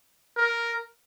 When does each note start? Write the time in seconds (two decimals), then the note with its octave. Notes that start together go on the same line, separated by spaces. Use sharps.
0.37 A#4